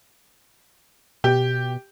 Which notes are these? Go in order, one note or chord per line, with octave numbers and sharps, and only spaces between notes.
B2 G4